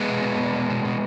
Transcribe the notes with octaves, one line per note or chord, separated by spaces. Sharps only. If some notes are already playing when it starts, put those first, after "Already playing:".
Already playing: G#3 B3
B2
B2
B2
B2
B2
B2